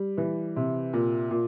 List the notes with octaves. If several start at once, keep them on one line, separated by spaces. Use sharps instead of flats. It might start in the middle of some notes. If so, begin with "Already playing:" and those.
Already playing: G3
E3
C3
A#2
A#2